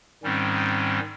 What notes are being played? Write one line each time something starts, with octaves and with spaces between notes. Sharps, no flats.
G#2 D#3 G3 C4 C#4